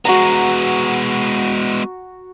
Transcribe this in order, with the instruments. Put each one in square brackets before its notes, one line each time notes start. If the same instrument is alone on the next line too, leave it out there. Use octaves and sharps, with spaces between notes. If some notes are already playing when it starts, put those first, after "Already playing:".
[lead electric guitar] G#3 B3 [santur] F#4 A#5